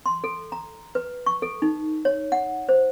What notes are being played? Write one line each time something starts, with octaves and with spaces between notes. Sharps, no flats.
C6
A4
A#5
B4
C#6
A4
D#4
C#5
F#5
C5